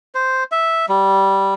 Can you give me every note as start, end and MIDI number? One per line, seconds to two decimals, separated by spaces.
0.15 0.44 72
0.52 0.86 76
0.89 1.54 55